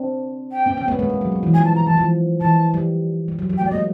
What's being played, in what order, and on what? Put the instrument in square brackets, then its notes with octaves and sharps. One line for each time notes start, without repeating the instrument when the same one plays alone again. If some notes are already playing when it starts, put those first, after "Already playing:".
Already playing: [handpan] C4 D4
[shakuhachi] G5
[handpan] B3 C#4
B3 C#4
A3 B3
G#3 A#3
G#3
F#3
F#3
E3
[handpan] F3 [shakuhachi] G#5
[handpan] F#3 [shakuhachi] A5
[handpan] F3 [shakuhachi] A#5
[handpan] E3 [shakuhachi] A5
[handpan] F3
[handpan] E3 [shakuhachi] A5
[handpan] G3
G3
F#3
F#3
[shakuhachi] G5
[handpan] A3
[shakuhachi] D5
[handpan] G#3 A#3 [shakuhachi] D#5